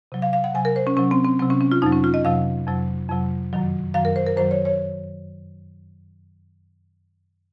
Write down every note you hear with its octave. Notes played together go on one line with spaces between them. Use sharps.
C3 F#3
F5
F5
F#5
C3 F#3 G#5
A#4
C5
C#4
C3 F#3 C#4
C4
C4
C3 F#3 C4
C#4
C#4
F4
F2 C3 F#3 D#4
C#4
F4
D#5
F2 C3 F#3 F5
F2 C3 F#3
F2 C3 F#3
F#2 D#3 F#3
F#2 D#3 F#3 F5
A#4
C5
A#4
F#2 D#3 F#3 C5
C#5
C#5